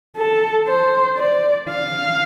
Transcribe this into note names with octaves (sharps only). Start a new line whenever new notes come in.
A4
C5
D5
F5